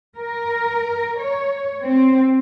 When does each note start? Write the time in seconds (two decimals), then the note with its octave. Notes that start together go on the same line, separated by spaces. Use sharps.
0.18 A#4
1.18 C#5
1.83 C4